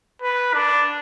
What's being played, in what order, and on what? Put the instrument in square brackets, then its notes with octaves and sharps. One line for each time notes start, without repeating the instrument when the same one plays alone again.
[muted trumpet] B4
D4